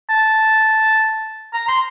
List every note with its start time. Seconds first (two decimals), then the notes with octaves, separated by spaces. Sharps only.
0.09 A5
1.53 A#5
1.68 C6